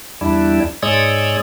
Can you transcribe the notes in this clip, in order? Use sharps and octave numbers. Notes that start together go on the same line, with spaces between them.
E2 G3 D4 E4
G#2 G#3 C#5 D5 D#6 E6